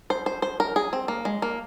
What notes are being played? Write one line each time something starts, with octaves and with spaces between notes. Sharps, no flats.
C5
C5
C5
A#4
G#4
C4
A#3
G#3
A#3